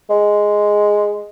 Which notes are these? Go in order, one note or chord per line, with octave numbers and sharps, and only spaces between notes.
G#3